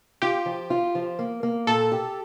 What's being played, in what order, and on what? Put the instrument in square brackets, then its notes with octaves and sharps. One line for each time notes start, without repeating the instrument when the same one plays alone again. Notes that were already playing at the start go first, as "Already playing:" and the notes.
[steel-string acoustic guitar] F4 [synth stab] G4
[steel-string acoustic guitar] F3
F4
F3
A#3
A#3
[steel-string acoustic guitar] A#2 [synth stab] A4
[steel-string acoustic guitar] G4